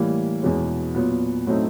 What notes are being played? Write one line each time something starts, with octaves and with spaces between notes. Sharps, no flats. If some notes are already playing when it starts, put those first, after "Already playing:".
Already playing: A2 E3 G3 A#3
E2 B2 G#3 C#4
A#2 F#3 B3
A2 F#3 A3 C4 D#4